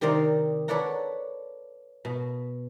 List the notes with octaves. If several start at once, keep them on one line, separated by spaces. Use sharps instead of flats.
C3 D#3 C4 D5 A#5
A4 B4 C#5 D5 F#5 A#5
B2